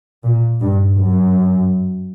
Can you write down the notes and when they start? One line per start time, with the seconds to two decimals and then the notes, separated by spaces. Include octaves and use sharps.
0.23 A#2
0.60 G2
0.96 F#2